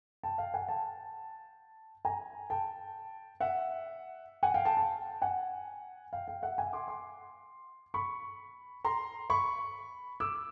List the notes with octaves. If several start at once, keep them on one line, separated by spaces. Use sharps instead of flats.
G5 A5
F5 G5
F#5 G#5
G5 A5
G#5 A#5
G5 A5
E5 F#5
F#5 G#5
F5 G5
G5 A5
G5 A5
F#5 G#5
F5 G5
F5 G5
E5 F#5
F#5 G#5
C6 D6
C6 D6
B5 C#6
A#5 C6
B5 C#6
D6 E6